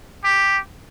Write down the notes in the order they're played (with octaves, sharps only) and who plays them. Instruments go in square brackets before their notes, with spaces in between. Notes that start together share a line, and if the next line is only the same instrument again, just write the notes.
[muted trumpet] G4